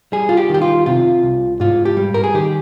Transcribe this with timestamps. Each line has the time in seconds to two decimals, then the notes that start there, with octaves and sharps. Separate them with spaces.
0.12 G3 G#4
0.29 F4
0.37 G4
0.50 D#3 G4
0.62 F4
0.86 C3 F4
1.23 C2
1.60 G#2 F4
1.85 G4
1.97 G3
2.14 A#4
2.24 G#4
2.34 D#3 G4